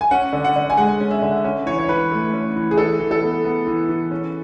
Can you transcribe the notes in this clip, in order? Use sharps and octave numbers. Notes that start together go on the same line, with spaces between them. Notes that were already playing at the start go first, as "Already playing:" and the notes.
G#5
C#4 F#5
D3
F#5
D3
G#5
G#3 F#5
C#4
E5
D3
C#4
E3 C#5
C#5
E3 B4
A3
C#4
E3
G#4
E3 A4
E3
A4
B3
B3
E3
E3
C#4